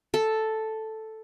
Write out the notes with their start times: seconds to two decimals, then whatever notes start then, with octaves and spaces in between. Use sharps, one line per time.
0.14 A4